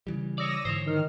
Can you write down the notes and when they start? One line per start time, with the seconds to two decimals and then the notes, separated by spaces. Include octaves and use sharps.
0.07 C#3 E3 G3
0.38 C#5 D5 D#6 E6 A#6
0.65 G#2 D3 E3 C5 C#5
0.87 D#3 F6